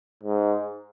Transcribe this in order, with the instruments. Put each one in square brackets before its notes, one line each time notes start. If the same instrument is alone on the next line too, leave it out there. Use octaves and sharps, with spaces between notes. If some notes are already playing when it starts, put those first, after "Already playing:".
[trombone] G#2